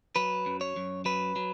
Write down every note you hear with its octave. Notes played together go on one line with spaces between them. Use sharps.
F#3 B4
F#2
C#5
F#2
F#3 B4
F#3